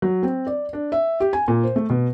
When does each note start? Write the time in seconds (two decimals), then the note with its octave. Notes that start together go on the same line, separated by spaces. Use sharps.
0.02 F#3
0.23 C4
0.47 D5
0.73 D4
0.92 E5
1.20 G4
1.33 G#5
1.48 A#2
1.64 C5
1.76 A3
1.90 B2